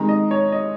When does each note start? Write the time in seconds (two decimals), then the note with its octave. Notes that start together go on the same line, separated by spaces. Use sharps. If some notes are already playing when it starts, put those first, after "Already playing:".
Already playing: C3 D#3 G#3 A#5
0.09 D#5
0.31 C#5
0.52 D#5